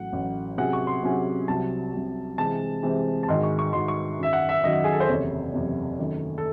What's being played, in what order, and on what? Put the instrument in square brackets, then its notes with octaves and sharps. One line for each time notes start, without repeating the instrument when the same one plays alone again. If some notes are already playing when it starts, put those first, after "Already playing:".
Already playing: [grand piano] A1 A2 F#3 [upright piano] F#5
[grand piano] A1 A2 F#3
[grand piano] C3 F#3 C#4 G#4 [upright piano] F#5
[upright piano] C#6
C6
[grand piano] C3 F#3 C#4 G#4
[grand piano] C2 C3 F#3 [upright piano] A5
[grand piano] C2 C3 F#3
[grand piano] C3 E3 G#3 C4 [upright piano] A5
[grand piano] C3 E3 G#3 C4
[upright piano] A5
[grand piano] G#2 D#3 G#3 D#4 F#4 [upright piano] C6
[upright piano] C#6
C#6
[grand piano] G#2 D#3 G#3 D#4 F#4 [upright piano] C6
[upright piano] C#6
[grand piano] F#2 D#3 F#3 [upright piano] E5
[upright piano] F#5
E5
[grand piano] F#2 D#3 F#3 [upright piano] D#5
[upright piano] G#4
A4
C5
[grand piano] F#1 E2 C3 [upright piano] C#5
[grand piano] F#1 E2 C3
F#2 D#3 A3
[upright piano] A4